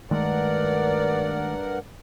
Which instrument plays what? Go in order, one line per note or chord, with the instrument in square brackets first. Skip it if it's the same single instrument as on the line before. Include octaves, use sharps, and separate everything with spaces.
[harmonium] G2 A#4 F#5 [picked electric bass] D#3 G#3 A3 [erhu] D5